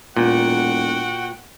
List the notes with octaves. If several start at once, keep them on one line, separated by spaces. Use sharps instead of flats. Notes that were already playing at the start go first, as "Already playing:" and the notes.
E1 A#2 F#4 F#5 G5